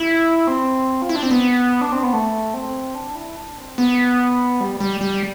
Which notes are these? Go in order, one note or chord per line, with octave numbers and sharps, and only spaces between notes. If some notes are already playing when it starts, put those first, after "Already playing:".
Already playing: E4
C4
F4
E4
D4
C4
B3
D4
C4
B3
A3
C4
D4
E4
D4
C4
B3
G3
G3
G3